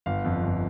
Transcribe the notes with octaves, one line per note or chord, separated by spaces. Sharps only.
G1 F5
F2
G1